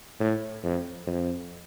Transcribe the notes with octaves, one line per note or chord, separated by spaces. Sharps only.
A2
F2
F2